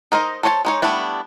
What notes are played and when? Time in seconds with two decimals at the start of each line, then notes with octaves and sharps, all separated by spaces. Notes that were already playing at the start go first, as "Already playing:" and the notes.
0.12 D#4 A#4 C5 D#5
0.43 A4 C5 C#5 D#5 A5
0.65 G#3 D#4 C#5
0.82 G3 A3 B3 D4 E4